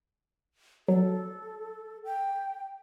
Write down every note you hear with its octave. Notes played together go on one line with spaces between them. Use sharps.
F#3 A4
G5